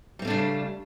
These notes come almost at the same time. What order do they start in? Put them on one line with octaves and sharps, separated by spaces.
G3 C4 A3 D4 C#3